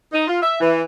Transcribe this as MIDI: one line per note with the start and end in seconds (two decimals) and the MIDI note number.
0.13 0.26 63
0.28 0.41 65
0.42 0.58 76
0.61 0.82 52